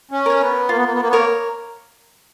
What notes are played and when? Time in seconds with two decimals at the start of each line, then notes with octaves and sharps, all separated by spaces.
0.11 C#4
0.26 A#4 C#5
0.40 B3
0.69 A#3 F4
0.76 B3
0.85 A#3
0.93 B3
1.00 A#3
1.08 B3
1.13 A#3 A#4 C#5